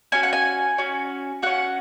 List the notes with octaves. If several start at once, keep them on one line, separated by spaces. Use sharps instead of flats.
C#4 F#4 G#5
F#5
G#5
C#4 F#4
C#4 F#4 F#5